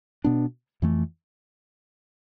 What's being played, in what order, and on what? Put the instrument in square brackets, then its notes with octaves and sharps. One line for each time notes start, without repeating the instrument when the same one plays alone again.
[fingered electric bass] B2 B3 D4
F2 E3 A3